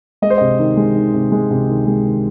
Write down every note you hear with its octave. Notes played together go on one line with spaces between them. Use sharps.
G#3 D#5
C5
C3 D#5
D#3
G#3
D#3
C3
G#3
C3
D#3
G#3
D#3